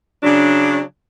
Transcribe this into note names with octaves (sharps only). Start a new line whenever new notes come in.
C#3 F#3 D4